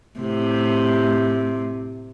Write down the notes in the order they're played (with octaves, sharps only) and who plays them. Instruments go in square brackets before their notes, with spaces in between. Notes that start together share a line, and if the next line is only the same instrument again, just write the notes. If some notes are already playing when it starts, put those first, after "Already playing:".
[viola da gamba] A2 C3